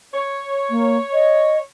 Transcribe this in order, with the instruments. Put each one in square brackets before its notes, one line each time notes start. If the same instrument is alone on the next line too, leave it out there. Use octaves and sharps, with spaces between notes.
[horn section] C#5
[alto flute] A#3
D#5